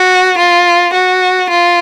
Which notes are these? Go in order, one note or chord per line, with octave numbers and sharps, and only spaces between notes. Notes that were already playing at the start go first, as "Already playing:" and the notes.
Already playing: F#4
F4
F#4
F4